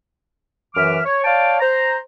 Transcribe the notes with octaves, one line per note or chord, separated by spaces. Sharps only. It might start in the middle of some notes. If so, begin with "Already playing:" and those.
F#2 E3 E5 D6 F6
C#5
C#5 D5 F5 G5 A5
C5 A#5